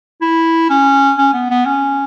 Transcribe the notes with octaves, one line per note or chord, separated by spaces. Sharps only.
E4
C#4
C#4
B3
B3
C#4